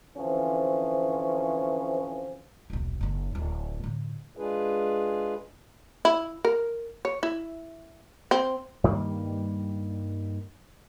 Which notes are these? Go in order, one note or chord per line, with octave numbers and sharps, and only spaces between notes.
D3 E3 F3 C4 C#4
D#1 B1
F#1 D#4
D1
A2 D3
G#3 D4 F4 G#4 B4
E4
A#4
C#5
E4
C4
G2 D#3 G3 A#3